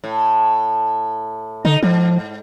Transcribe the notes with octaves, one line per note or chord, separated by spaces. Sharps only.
A2
D3 D#4
G#2 F3